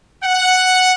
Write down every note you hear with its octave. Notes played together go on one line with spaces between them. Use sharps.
F#5